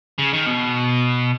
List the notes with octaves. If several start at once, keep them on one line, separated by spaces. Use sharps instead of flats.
C#3
D#3
B2